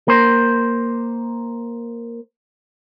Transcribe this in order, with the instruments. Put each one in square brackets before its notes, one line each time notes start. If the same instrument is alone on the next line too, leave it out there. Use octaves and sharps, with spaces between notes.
[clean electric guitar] A#3 C5